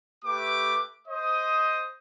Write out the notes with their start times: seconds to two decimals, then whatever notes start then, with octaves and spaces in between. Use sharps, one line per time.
0.25 A3 G4 B4 D6
1.07 C5 D#5 D#6